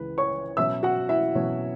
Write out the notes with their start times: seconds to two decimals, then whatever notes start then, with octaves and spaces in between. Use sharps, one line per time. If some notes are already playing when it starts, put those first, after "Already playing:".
Already playing: C#2 C#3 E3 B4
0.18 C#5 C#6
0.57 B2 F#3 C#4 E5 E6
0.83 F#4 F#5
1.09 E4 E5
1.35 B2 F#3 C#4 C#5